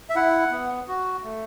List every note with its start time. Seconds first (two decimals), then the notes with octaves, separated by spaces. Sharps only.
0.10 E5
0.16 E4 F#5
0.51 B3
0.88 F#4
1.23 A3